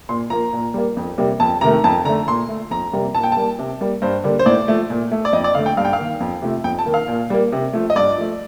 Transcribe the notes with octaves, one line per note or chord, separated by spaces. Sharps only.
A#2 C6
F3 A#3 A#5
A#2
G3 A#3
F2
C3 G3 A#3
F2 A5
C3 D#3 A3 A#5
F2 A5
D3 A3 A#5
A#2 C6
A3
F2 A#5
C3 G3 A#3
A#2 A5
G5
G3 A#3 A5
C3
G3 A#3
G2 C5
D3 G3 A#3
C5
A2 D5
F3 A3
A#2
A3
D5
F2 D#5
D5
D3 A3 F5
G5
G2 F5
G5
F5
D#3 A#3
F2
C3 F3 A3
F2 G5
A5
D#3 A#3
F5
A#2
G3 A#3
C3
F3 A3
D#5
G2 D5
F3 A3